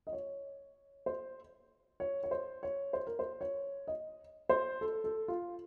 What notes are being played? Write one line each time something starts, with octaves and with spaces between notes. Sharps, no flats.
D#5
C#5
C5
C#5
C#5
C5
C#5
C5
A#4
C5
C#5
D#5
C5
A4
A4
F4